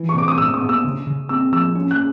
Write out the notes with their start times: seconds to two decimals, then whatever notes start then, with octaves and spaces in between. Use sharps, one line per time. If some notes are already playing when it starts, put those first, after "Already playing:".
Already playing: E3
0.09 C#6
0.15 C3 D6
0.28 D#6
0.38 A2 E6
0.54 D#6
0.61 B3
0.69 E6
0.84 C#3
1.07 C#3
1.29 C4 E6
1.52 F3 E6
1.75 C#4
1.91 F#6